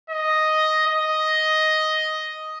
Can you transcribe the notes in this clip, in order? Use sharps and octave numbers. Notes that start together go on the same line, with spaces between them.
D#5
D#5